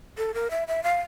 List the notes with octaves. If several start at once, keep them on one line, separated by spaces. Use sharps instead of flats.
A4
A#4
E5
E5
F5